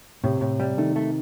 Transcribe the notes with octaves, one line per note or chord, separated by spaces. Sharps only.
A2 C3
A2
G3
D#3 A3
A3